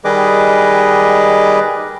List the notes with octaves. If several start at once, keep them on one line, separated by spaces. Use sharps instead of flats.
D#3 G3 G#4 B4 D#5 D6